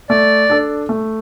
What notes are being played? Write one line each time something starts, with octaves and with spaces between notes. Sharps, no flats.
A3 D5
D4 A4
A3